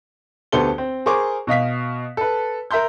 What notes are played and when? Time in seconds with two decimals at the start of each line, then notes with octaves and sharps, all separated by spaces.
0.52 D2 B3 G4 A4 C5 G7
0.78 C4
1.06 G#4 A#4 C5 C#6 D6
1.47 B2 D#5 F5 B6
2.17 A4 B4
2.71 A#4 E5 A#5 C6 G6